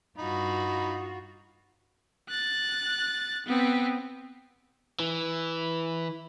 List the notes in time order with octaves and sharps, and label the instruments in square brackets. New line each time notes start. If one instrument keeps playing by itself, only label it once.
[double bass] G2 [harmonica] D#4 B5 [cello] F4 F#4
[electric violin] F#6 A6
B3 C4
[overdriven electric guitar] E3